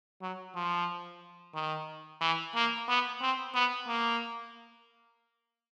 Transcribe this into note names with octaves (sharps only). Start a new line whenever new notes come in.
F#3
F3
D#3
E3
A#3
B3
C4
B3
A#3